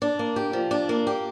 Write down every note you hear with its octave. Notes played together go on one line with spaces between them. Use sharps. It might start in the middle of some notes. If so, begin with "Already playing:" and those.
D4
A#3
G4
F3
D4
A#3
G4